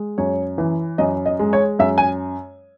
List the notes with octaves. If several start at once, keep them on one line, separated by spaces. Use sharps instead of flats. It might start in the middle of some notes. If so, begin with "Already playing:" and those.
Already playing: G#3
F#2 C#5
E3
F#2 D#5
D#5
G#3
C#5
F#2 E5
G#5